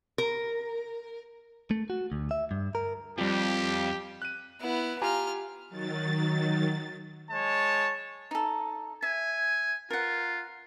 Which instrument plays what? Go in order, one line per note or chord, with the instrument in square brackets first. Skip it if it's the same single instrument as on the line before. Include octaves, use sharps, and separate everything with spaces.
[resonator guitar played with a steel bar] A#4
[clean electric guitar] A3
F#4
D2
E5
G2
A#4
[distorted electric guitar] F2 [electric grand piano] F3 G3 [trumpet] G4
[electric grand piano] F#6 D#7
[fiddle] B3 E4
[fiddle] F4 F6 [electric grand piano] G4 G#5 A#5
[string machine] D#3 F#3 A6
[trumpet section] G#3 C#5 A5
[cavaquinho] D#4 A4
[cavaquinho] E5 [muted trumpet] G#5
[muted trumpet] F4 [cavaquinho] A#4 F#5